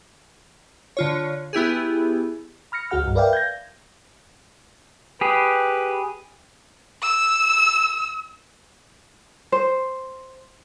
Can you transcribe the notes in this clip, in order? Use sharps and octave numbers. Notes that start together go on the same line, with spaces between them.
D3 F4 C#5
B3 E4 G4 G#4
B5 F6 A#6 C#7
D2 F#4 G#4 F#5 F6
C2 G2
A#4 B4 D5 E5 F5 G5
G6 G#6 A#6
G4 G#4 B4
E6
C5